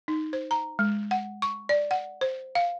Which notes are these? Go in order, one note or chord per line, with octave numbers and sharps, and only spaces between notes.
D#4
C5
A#5
G#3
F#5
C#6
D5
F#5
C5
F5